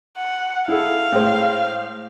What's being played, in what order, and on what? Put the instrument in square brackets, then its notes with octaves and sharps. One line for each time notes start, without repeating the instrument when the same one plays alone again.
[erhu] F#5
[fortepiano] E4 G#4 A4 [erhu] F5
[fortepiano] A2 G#3 C5